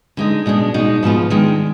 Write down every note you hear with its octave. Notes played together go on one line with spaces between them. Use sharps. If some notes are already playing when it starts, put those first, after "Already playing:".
D3 G#3 D#4
B2 G#3 D4
B2 G#3 D#4
G#2 F3 B3 F4
D#3 G#3 D4